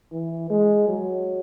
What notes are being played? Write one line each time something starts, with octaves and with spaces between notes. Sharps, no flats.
E3
G#3
F#3